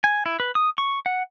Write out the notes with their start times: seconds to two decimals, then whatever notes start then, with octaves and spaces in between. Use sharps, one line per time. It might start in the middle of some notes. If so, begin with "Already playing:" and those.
0.04 G#5
0.26 E4
0.40 B4
0.55 D#6
0.78 C#6
1.06 F#5